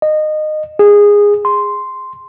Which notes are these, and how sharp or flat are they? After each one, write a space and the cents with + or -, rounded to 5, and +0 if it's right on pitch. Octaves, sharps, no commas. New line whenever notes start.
D#5 -20
G#4 -15
C6 -5